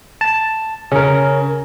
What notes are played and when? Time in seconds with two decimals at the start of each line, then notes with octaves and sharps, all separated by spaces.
0.21 A5
0.92 C#3 C#4 A#4